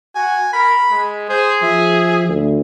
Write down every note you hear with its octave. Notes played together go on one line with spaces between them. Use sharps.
F#4 G#5
A#4 B5
G#3
G#4 C5
F3 E5
D2